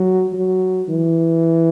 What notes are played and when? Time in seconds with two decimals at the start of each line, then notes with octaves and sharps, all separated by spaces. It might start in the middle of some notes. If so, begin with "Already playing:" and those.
Already playing: F#3
0.33 F#3
0.89 E3